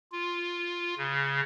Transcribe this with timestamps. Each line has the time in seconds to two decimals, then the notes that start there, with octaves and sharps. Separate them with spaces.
0.12 F4
0.98 C#3